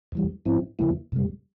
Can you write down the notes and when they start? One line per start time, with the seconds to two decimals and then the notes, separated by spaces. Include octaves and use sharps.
0.12 E2 E3 G3
0.45 G#2 F3 C4 E4
0.79 E2 C#3 F3 A#3 E4
1.12 F2 C3 G3